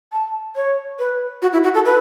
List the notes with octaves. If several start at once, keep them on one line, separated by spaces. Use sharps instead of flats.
A5
C#5
B4
F#4
E4
F#4
A4
B4